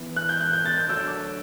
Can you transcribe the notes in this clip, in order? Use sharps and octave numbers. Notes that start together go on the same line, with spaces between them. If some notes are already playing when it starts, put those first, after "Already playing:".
Already playing: E3 B3 E4 B4
F#6
G6
F#6
G6
A6
G6
D3 F#3 A3 D4 F#4 E6
D6